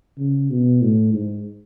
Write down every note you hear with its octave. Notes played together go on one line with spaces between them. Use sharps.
C#3
B2
A2
G#2